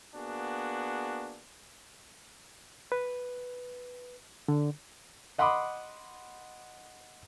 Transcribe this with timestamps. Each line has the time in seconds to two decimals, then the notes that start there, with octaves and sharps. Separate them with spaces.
0.15 A#3 B3 D4 F#4 G#4
2.92 B4
4.48 D3
5.38 D#5 F#5 B5 C6 D6 D#6